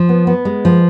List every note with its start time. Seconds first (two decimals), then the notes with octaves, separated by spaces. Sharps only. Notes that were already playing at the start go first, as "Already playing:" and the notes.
Already playing: F3
0.09 B3
0.27 B3
0.45 G#3
0.65 F3